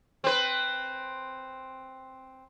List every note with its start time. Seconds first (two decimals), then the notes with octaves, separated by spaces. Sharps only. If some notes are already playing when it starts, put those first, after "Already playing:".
0.24 C4 B4